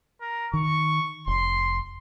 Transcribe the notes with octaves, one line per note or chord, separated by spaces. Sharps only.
A#4
D#3 C#6
F1 C6